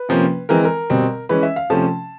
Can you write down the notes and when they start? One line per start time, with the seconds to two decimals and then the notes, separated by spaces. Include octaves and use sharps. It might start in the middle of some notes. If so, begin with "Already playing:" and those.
Already playing: B4
0.09 C3 F3 A#3 C#4
0.49 E3 G#3 C4 A#4
0.64 A#4
0.90 B2 G3 C4
1.29 E3 G#3 C#4 B4
1.43 E5
1.56 F5
1.70 C3 F3 A3 C#4 A5